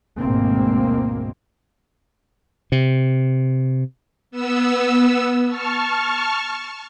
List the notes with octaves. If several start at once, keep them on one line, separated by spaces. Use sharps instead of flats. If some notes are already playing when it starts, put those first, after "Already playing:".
G#1 D2 B2 G#3 A#3 C4
C3
B3 E6
A5 C#6 F6